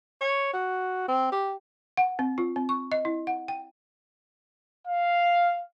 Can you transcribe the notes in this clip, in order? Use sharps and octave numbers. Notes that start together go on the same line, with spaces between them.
C#5
F#4
C4
G4
F#5
C4
F4
C4
C#6
D#5
E4
F#5
G5
F5